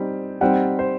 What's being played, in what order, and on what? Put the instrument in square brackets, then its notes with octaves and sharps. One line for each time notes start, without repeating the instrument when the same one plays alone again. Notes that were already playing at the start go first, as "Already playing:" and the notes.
Already playing: [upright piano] G3 C4 D#4
[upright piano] G3 C4 D#4 [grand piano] F#5
[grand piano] C5